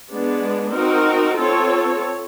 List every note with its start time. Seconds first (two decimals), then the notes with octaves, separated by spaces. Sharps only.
0.11 G#3 B3 D4
0.74 C4 D#4 F#4 A#4
1.37 C4 F4 A4 C#5